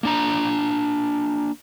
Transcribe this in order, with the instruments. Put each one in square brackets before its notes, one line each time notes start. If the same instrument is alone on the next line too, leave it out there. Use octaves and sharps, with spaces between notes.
[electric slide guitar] A#3 D4 A#5